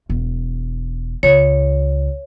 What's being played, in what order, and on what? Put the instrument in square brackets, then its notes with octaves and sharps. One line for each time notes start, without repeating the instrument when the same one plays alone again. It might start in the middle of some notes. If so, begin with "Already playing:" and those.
[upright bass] E1
[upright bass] C#2 [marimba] C#5